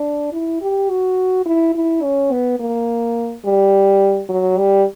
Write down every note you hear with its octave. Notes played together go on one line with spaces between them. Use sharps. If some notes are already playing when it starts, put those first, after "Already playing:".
Already playing: D4
E4
G4
F#4
E4
E4
C#4
B3
A#3
G3
F#3
G3